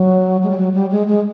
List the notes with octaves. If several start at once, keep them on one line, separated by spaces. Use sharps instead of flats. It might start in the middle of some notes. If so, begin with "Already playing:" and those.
Already playing: F#3
G#3
G3
F#3
G3
G#3
G#3